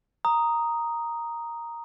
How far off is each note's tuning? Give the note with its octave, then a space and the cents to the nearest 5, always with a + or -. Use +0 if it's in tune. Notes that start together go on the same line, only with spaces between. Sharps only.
A#5 +0 D#6 +0